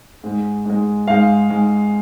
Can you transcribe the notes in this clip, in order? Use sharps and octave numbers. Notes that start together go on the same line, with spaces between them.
G#2 G#3
G#2 G#3
G#2 G#3 F5
G#2 G#3